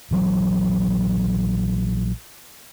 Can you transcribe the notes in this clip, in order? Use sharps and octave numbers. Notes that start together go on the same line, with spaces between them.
A#1 E3 F#3